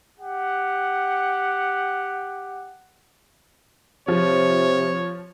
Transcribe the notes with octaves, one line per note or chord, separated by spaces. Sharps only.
G4 F#5
C3 F3 C#5